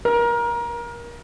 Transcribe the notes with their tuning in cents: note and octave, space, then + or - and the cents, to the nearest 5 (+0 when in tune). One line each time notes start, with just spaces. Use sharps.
A#4 +25